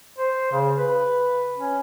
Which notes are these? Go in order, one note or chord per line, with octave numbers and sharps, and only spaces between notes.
C5
C#3
B4
C#4